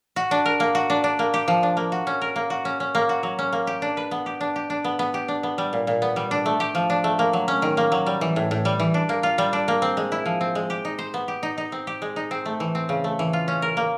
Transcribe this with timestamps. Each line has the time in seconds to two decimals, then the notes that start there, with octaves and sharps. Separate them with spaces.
0.16 F#4
0.31 D4
0.46 A#4
0.60 A#3
0.75 F#4
0.90 D4
1.04 D4
1.19 A#3
1.34 G4
1.48 F3
1.63 D4
1.77 A#3
1.92 F#4
2.07 C#4
2.22 A#4
2.36 A#3
2.50 F#4
2.65 C#4
2.80 C#4
2.95 A#3
3.09 F#4
3.23 F#3
3.39 C#4
3.53 A#3
3.67 G4
3.82 D4
3.97 B4
4.11 B3
4.26 G4
4.41 D4
4.56 G4
4.70 D4
4.84 B3
4.99 B3
5.14 G4
5.28 D4
5.43 B3
5.58 G3
5.73 A#2
5.87 A#2
6.02 B3
6.16 G3
6.31 D4
6.46 A3
6.60 G4
6.75 F3
6.90 D4
7.04 A3
7.19 A#3
7.33 F#3
7.48 C#4
7.62 D#3
7.77 A#3
7.92 F#3
8.06 G3
8.21 E3
8.36 A2
8.51 A2
8.65 G3
8.80 E3
8.94 D4
9.09 A#3
9.23 F4
9.38 G3
9.53 D4
9.68 A#3
9.82 C4
9.97 G#3
10.12 E4
10.26 F3
10.41 C4
10.55 G#3
10.70 G4
10.85 D#4
10.99 C5
11.14 B3
11.28 G4
11.43 D#4
11.58 D#4
11.72 C4
11.87 G4
12.02 G#3
12.16 D#4
12.31 C4
12.46 A3
12.60 E3
12.75 C4
12.89 C#3
13.04 A3
13.19 E3
13.33 F4
13.48 C#4
13.62 A#4
13.77 A#3